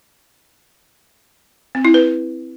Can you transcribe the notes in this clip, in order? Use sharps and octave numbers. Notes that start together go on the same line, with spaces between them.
C4
E4
B4